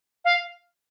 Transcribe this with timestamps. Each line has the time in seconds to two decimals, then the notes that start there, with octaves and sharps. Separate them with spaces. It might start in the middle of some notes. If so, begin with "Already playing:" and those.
0.25 F5